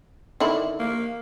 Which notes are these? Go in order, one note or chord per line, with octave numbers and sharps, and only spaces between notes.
D3 D#3 E4
A#3